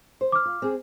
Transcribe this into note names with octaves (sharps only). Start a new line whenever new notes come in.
C5
D6 F6
F4
C4 G#4